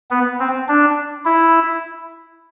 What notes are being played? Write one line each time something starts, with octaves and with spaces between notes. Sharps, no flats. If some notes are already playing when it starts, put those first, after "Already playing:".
B3
C4
D4
E4